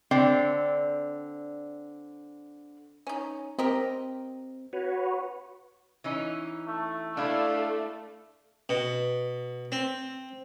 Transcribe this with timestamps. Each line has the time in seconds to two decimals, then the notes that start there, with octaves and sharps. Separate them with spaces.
0.11 D3 C4 D5
3.07 C#4 D#4
3.59 C4 G4 A#4 D#5
4.73 F#4 B4 C#5
6.04 E3 C#4 D#4
6.67 A3
7.17 A3 D4 E4 F5
8.69 B2
9.72 C4